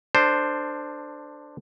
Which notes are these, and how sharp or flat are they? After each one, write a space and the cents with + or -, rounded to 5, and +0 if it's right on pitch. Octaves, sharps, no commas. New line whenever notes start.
D4 +10 A4 +30 C5 +0